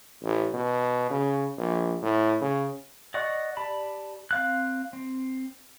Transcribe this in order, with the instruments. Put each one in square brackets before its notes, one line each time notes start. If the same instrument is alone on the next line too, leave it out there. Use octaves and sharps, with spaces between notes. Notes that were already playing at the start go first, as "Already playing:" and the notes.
[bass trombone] A1
B2
C#3
A#1
A2
C#3
[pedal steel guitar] D5 D#5 F#5 C#6 F#6
G4 D5 A5 B5
C4 F5 F#6
C4